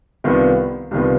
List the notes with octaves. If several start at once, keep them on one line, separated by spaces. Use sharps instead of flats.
C2 C3 D#3 B3 F4
C2 C3 D#3 B3 F4